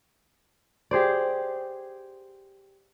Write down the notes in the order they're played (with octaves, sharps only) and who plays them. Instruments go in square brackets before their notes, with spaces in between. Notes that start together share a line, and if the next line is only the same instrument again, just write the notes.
[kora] G4 G#4 C5 D5